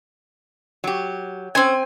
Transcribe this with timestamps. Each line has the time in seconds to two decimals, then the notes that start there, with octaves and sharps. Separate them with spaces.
0.84 F#3 G4
1.55 C4 C#4 C5 G#5